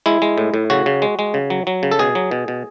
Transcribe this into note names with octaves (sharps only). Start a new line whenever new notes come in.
G#3 E4
G#3
A2
A2
C#3 F#4
C#3
G#3
G#3
C#3
F#3
F#3
C#3
A4
B2 G#4
F#3
B2
B2